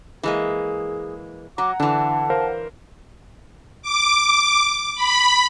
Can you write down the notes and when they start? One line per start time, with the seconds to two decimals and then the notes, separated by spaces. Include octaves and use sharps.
0.23 E3 G#3 A#3 G#4
1.58 F#3 F#5 A#5 D6
1.80 D3 E3 D4 A5
2.30 A#4 C5 F5
3.82 D6
4.95 B5